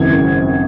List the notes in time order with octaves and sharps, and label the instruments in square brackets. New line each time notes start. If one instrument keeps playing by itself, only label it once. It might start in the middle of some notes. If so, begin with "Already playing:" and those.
Already playing: [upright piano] G#1 F#2 C#3 E3 G#6